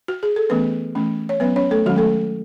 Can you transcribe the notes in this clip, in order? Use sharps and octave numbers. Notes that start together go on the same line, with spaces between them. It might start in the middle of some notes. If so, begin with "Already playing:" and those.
F#4
G#4
A4
E3 A3 B3 C#4 B4
E3 A3 C#4
C#5
F#3 B3 C#4 B4
C#4 C#5
A3 A4
D#3 F#3 G#3 C#4 F#4
A3 A4